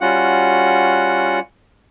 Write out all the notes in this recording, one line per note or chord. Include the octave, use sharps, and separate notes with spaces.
G3 C#4 F4 F#4 F#5